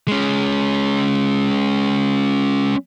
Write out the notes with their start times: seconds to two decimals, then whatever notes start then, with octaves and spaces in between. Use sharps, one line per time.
0.08 G#3 C#4